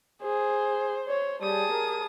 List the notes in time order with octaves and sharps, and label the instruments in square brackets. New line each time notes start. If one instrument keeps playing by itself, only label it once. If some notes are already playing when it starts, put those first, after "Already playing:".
[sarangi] G#4 [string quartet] C5
[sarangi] C#5
[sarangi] G3 [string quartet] G#4 A5 D#6
[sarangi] A#4